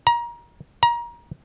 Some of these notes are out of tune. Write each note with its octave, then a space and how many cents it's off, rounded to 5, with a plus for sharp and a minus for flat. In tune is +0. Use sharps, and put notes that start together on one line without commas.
A#5 +25
A#5 +25